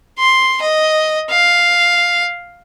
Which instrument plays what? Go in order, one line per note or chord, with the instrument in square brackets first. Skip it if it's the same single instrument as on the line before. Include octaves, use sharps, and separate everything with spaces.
[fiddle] C6
D#5
F5